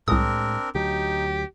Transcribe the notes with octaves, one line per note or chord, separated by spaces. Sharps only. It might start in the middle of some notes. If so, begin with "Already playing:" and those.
C2 A2 G#3 C4 D4 A#4 D#6
D2 F#3 D#4 G4